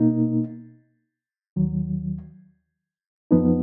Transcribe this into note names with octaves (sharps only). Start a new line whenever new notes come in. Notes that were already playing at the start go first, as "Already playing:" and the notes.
Already playing: B2 A#3 D#4
D#2 D#3 F#3
F2 F3 B3 D#4